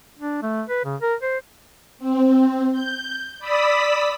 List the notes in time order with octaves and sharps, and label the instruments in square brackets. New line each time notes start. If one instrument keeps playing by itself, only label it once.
[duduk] D4
A3
B4
C#3
A#4
C5
[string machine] C4
G6
D5 B5 D#6 E6 B6